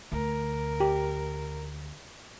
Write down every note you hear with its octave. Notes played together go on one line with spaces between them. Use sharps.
D2 A#4
G4